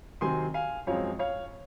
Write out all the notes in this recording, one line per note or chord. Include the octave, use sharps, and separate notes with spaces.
C3 D#3 F#3 C4 G#5 C6
F5 G#5
F#2 F3 G#3 C4 C#5 F5
C#5 F5